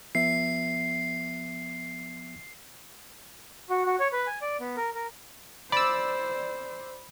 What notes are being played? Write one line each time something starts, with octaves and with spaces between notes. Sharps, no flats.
F3 B3 E5 C7
F#4
F#4
C#5
B4
G#5
D5
B3
A#4
A#4
C5 D5 B5 E6